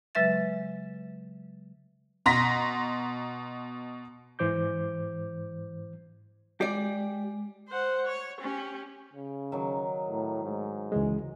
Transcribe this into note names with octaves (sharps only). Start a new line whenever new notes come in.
C#3 F#3 G#3 B4 E5 A6
B2 A#5 C6 A#6 B6
G#2 E3 C5 D6 G6
G#3 G4 D5
C5 F#5
C#5
C#4 G4
C#3
D#3 F#3
A2
G#2
C#2 E3 G#3